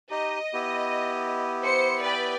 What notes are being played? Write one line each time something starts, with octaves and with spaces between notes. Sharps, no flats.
D#4 G4 D#5
B3 E4 G4
C5 C#7
B4 D5 G5